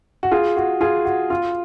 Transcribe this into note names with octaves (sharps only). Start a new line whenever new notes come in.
F#4
F4 G#4
F#4
F4 G#4
F#4
F4